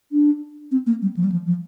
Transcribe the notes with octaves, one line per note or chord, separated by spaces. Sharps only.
D4
C4
A#3
G3
F3
G3
F3
F3